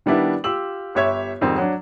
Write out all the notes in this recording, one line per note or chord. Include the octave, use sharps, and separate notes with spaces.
D#3 G3 B3 D4 E4
F4 G4 E6 F#7
G1 G4 C#5 E5 G#6
F2 G#2 D#3 G3 C4
F#3 D4